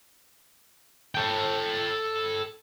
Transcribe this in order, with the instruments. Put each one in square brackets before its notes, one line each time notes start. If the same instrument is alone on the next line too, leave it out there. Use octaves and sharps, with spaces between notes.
[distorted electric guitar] A4 G5